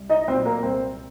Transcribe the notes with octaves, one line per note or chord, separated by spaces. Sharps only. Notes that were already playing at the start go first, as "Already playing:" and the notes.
Already playing: C2
D#4 D#5
A#2 F#3 C4 C5
A#3 A#4
C2 C4 C5